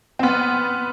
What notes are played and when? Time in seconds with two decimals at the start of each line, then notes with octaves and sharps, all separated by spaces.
0.19 C4
0.23 B3 C6 F6 A6